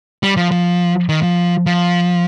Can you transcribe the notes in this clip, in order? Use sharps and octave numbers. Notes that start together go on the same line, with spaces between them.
G3
F3
F3
D#3
F3
F3